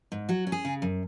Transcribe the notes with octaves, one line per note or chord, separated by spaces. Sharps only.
G#2
F#3 F#4
C#4
G#4
C#3
F#2